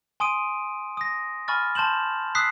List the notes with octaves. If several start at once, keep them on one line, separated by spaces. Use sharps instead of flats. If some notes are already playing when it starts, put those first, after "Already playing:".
G#5 C6 D#6 D7 D#7
D#6 A#6
G#5 B5 C#6 F6 A6
A5 C6 G6 E7 F#7
D#6 E6 F#6 B6 C7